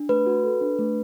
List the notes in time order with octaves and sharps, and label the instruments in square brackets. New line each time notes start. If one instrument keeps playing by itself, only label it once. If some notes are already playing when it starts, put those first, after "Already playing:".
Already playing: [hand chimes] D4
A3 B4
F#4
A4
D4
A3